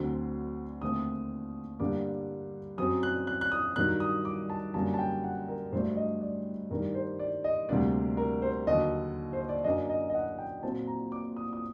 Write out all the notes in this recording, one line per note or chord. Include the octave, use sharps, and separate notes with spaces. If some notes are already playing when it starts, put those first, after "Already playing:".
Already playing: D2 D3 F#3 C4
D#2 D3 A3 C4 D#6
G2 D3 G3 A#3 D4 D6
F#2 F#3 C4 D#6
F#6
F#6
F#6
D#6
G2 D#3 F#3 F#6
D#6
D6
A5
F#2 D3 G3 A#3 A5
A5
G5
F#5
A#4
G2 F#3 A3 D4 C5
D#5
D5
G2 D#3 G3 A#4
C5
D5
D#5
D2 C3 G3 A#3 D4 D5
A#4
C5
D#2 D3 F#3 D#5
C5
D5
F#2 F#3 A#3 D4 D#5
D#5
D#5
F#5
G5
A#2 F#3 C4 A5
A#5
D6
D#6
D#6